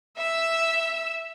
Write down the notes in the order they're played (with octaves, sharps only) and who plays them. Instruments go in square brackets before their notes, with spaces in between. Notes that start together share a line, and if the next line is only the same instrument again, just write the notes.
[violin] E5 E6